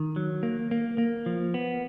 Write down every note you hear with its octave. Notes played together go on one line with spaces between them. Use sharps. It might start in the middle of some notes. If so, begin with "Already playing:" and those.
Already playing: D#3
F#3
A#3
A#3
A#3
F3
B3